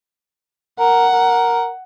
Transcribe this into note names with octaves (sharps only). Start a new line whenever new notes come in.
A#4 F#5
A#4